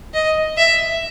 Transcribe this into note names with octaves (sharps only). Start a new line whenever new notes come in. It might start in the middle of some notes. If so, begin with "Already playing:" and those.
D#5
E5